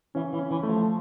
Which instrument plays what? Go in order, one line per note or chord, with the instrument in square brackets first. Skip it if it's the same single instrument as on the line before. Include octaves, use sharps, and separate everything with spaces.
[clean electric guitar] E3 [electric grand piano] C#4
[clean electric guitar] E3
[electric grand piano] C#4
[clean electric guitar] E3
[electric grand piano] A3
[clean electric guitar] F3